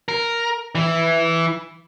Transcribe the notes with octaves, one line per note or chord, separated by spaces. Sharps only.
A#4
E3